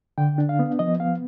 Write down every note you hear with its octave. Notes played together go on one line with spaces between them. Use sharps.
D3 G5
D4
F5
B3
F3 D#5
B3 F5